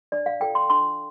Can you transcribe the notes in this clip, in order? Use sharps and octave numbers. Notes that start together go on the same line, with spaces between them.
D4 D5
F5
F4 A4 G5
C6
D4 C6